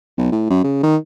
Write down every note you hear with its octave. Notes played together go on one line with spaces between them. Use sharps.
B1
A2
F#2
C#3
D#3